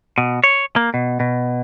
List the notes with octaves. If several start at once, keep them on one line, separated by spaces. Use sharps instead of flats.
B2
C#5
A#3
B2
B2